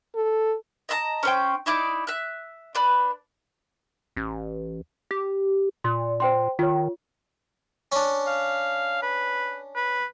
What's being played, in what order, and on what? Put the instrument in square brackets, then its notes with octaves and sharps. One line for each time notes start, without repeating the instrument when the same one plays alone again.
[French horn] A4
[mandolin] D#5 E5 A5 A#5
C#4 C5 G5
D#4 E4 D5 D6
E5 F#6
D4 B4 B5
[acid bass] A1
G4
[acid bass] A#2 [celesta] C6
[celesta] C5 G5 C6
[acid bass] D#3 [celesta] F4 C#5
[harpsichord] C#4 D4
[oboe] F5
B4
B4